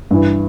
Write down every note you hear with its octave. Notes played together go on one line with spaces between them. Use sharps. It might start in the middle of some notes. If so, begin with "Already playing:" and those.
G2 E3